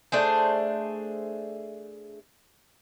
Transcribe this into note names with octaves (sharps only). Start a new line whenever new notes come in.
A3 D4 G#4 C5